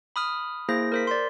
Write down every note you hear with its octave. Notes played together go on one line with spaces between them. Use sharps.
B5 D#6 F6
A#3 E4 G#4 C5 A#6
A#4 C5 B6
D5 C6